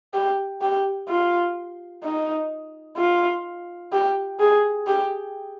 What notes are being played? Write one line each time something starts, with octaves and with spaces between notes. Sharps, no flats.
G4
G4
F4
D#4
F4
G4
G#4
G4